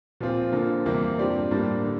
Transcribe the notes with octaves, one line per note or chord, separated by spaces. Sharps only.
A#2 F3 C4 F4
D3 F3 A#3
E2 C3 G3 A#3
G2 F3 C4 G4 D5
A2 G3 A#3 D4
D3